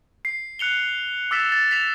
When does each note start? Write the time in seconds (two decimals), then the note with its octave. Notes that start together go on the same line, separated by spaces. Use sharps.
0.25 C7
0.59 F#6 C#7 F7 G7
1.31 D6 E6 A6 B6 E7
1.52 A6
1.71 B6 E7 F7